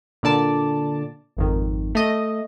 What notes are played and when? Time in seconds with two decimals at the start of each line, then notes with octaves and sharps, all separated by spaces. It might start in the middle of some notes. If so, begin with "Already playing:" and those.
0.23 A#2 D3 D5 A5
1.37 G#1 F2 D#3
1.95 A3 D#5